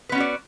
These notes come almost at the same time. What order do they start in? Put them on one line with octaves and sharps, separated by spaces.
B4 B3 C#4 F#4 D5